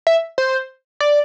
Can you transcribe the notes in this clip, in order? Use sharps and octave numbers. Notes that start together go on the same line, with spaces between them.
E5
C5
D5